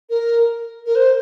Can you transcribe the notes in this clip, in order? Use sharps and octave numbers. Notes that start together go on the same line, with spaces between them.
A#4
A#4
C5